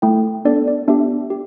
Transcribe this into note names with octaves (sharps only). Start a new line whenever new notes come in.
A3 E4 A4 G5
B3 D4 A4 D5
D5
B3 D4 G4 E5
G4